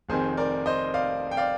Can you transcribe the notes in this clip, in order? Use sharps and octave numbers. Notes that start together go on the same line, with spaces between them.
F1 F2 D#3 G#4 C5
A#4 D5
C5 D#5
D5 F5
G5
D5 F5